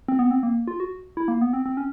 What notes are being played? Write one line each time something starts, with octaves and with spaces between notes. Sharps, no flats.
C4
B3
C4
A#3
F4
F#4
E4
A#3
B3
C4
C4
C#4